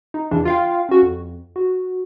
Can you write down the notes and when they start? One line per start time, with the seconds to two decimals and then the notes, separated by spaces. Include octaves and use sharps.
0.14 D#4
0.31 E2 C#3 E3 D4
0.45 F4 F5 G5
0.89 C#4 F#4
1.02 F2
1.56 F#4